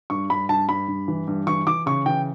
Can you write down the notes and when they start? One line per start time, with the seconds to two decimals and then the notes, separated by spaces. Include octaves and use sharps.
0.10 G2 C#6
0.30 G2 B5
0.49 G2 A5
0.69 G2 B5
0.88 G2
1.08 E3
1.28 G2
1.47 E3 C#6
1.67 E3 D6
1.86 C#3 C#6
2.06 E3 G5